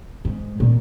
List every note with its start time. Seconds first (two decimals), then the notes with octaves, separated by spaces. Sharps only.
0.25 G#2
0.60 A#2